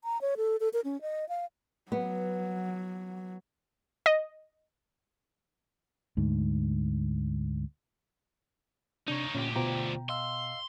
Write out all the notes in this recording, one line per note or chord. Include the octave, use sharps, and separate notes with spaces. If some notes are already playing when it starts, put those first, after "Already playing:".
A#5
C#5
A4
A4
A#4
C#4
D#5
F5
F#3 B3
D#5
D2 G#2
C3 D4 D#4 C#5
D2 A#2 C#4 G4
B2 F4 C5 G5 A#5
D#5 F5 C6 E6